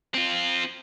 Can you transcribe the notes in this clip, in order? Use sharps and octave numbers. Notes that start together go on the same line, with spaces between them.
C4 F4